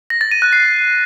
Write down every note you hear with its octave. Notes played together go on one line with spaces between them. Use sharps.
A#6
A6
D#7
F#6
C7